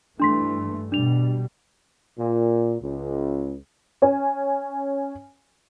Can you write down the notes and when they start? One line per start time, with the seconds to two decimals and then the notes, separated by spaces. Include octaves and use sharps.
0.20 G2 E3 A3 D4 C6 B6
0.92 B2 G3 D4 F7
2.18 A#2
2.81 C#2
4.02 C#4 C#5 G#5